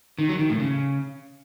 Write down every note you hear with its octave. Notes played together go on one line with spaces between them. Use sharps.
D#3
F#3
D#3
A2
C#3